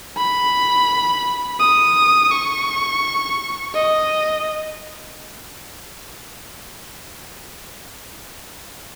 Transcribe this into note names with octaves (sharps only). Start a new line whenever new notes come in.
B5
D#6
C#6
D#5